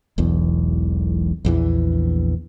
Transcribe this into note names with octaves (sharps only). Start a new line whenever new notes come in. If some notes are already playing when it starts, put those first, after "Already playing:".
E1 B1 E2
A#1 E2 E3